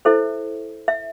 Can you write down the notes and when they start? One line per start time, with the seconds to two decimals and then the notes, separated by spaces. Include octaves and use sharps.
0.05 E4 A4 C5 E5
0.88 E5